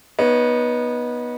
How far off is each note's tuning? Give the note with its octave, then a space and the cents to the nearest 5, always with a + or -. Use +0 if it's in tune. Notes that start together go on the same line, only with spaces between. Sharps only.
B3 -20 D#4 +0 C#5 +0